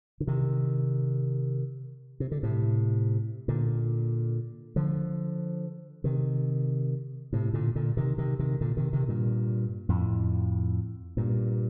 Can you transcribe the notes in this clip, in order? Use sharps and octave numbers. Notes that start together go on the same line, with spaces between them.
D3
C3 D#3
C3
D3
A2 C3
A#2 D3
D3 F3
C3 D#3
A2 C3
A#2 D3
A#2 D3
C3 D#3
C3 D#3
C3 D#3
A#2 D3
C3 D#3
C3 D#3
G2 A#2
F2 A2
G2 A#2